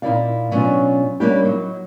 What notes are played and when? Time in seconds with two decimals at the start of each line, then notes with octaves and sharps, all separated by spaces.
0.02 A#2 D#4 E4 C#5 D5 F5
0.51 B2 F#3 C#4 D4 F4
1.20 G3 A#3 C#4 D4 E4 G4
1.45 F#3 D#4